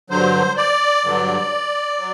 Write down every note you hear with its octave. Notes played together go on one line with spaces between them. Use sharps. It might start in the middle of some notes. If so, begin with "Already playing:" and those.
G2 D3 F#3 C5
D5
G2 D3 F#3
F#3